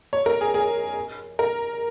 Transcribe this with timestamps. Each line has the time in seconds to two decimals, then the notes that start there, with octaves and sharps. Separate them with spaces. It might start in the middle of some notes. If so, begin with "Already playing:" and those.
0.13 C#5
0.26 A#4
0.41 G#4
0.54 G#4
1.39 A#4